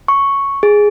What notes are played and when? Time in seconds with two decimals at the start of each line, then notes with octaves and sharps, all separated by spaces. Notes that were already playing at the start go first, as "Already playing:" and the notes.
0.08 C#6
0.63 G#4